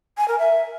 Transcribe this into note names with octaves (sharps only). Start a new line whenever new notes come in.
G#5
A#4
E5